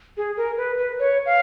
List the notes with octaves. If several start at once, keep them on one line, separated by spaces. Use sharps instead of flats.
G#4
A#4
B4
B4
C#5
F5